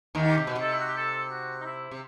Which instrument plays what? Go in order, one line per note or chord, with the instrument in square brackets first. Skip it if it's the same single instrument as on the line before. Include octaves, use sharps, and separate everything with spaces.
[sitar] D#2 D#3
[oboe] G4
[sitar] C3
B2
C3
[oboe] A4
E4
F#4
G4
A4
F#4
D#4
E4
[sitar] C3